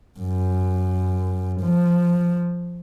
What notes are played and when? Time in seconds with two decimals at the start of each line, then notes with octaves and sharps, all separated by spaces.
0.19 F#2
1.61 F3